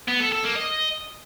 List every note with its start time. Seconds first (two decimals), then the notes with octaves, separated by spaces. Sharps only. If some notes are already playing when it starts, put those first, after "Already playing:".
0.08 B3
0.20 A4
0.32 A4
0.44 A#3
0.55 D#5